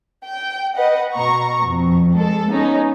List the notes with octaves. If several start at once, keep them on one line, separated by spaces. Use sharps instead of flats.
G5
B4 D#5 F#5
B2 A#5 C#6
F2
G#3 A4
B3 C#4 D#4